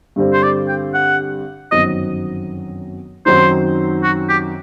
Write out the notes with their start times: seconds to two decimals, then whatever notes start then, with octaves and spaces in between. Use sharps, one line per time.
0.16 G2 D3 G3 C4
0.33 C5
0.43 D5
0.68 G5
0.94 F#5
1.71 G1 F#2 D#3 F#3 C4 D#5
3.26 F#2 D#3 F#3 C4 D#4 C5
4.03 F#4
4.29 G4